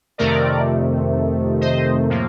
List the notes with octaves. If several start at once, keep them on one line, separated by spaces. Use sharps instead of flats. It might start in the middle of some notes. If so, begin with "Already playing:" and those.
F2 C3 D#3 A3 A#4 D5
C5 D#5
A2 F3 A#3